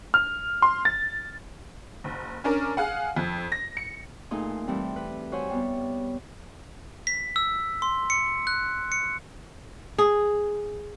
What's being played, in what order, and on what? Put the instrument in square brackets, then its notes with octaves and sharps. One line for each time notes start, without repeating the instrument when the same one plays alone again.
[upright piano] F6
C6
A6
[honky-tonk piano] F#1
C#4 D4 A#4
G#4 F5 F#5
F2
A#6
C#7
[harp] A#2 A3 D#4 G#4 C6
E3 G3 A3 C4
B4
F#4 C5 C#5 E5 F#5 G#5
G3 B3
[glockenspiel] B6
E6
C6
C#7
F#6
C#7
[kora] G#4